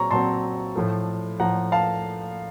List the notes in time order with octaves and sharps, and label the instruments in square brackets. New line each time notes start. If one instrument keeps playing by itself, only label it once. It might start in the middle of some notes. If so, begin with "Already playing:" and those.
Already playing: [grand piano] A#2 F#3 C4 C#5 A#5 C#6
A#2 F#3 C4 A5 C6
A2 F3 A3
A2 F3 A3 F#5 A#5
F5 A5